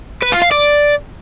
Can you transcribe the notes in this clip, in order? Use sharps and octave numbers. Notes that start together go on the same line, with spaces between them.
B4
F4
F5
D5